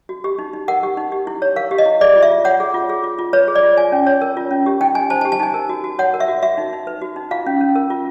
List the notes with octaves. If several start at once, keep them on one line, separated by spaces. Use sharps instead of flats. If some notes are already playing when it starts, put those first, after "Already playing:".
F#4
G4
D#4
D#4
A#4 F#5
G4
D#4
G4
E4
C#5
A#4 F5
G4
D#5
E4
G#4 D5
F4
E5
F4
C#5 F#5
G#4
F4
G#4
F4
F4
B4 C#5
G#4
D5
F4
F4 G#5
C#4
C#5
A#4
F4
C#4
G4
D#4 G5
D#4 G#5
C5 A5
A5
G4
A5
D#4 G#5
A#4
F#4
F#4
C#5 F#5
A#4
E5
F#4
F#4 E5
D#4
D#4
B4
F#4
D#4
F4 F5
C#4
C#4
A#4
F4